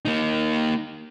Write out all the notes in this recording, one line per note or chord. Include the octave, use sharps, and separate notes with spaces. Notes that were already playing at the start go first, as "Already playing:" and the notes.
A#3 D#4